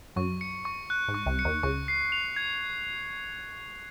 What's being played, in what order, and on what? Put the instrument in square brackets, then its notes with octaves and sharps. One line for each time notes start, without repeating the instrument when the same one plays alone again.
[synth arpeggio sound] F#2 F#3 [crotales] C#6
[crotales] C#7
C#6
F#6
[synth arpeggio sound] G#2
[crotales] C#6
[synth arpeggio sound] C2 C3
[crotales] C#7
[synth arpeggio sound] D#2 D#3
[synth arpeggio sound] C#2 C#3 [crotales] C#6
[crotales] C7
F7
G#6